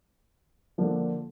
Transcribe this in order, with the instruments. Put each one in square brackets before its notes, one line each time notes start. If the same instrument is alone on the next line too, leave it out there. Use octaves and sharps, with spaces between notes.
[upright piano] D3 F3 A#3 D4